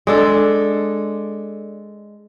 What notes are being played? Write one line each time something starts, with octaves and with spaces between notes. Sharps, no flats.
G#3 D4 A4